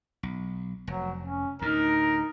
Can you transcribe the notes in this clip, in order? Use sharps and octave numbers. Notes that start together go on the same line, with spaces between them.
B1
F1 F#3
C#4
D2 A2 D#4 A#4